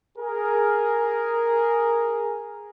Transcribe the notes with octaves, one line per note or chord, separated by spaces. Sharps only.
G#4 A#4